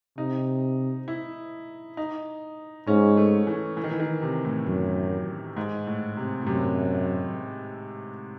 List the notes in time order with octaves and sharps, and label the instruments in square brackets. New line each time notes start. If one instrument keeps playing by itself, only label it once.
[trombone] C3 [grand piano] D#4
[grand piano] E4
D#4
[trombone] G#2 [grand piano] C#4
[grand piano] A3
E3
E3
D#3
E3
D#3
C3
A2
[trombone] F#2 [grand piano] A2
[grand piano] G#2
A2
C3
A2
[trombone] F#2 [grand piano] C3